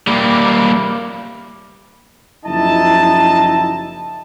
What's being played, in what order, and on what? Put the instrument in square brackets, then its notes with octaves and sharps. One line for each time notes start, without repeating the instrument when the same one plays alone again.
[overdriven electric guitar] G3 A#3
[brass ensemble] F#1 F3 D#4 E4 D#5 A5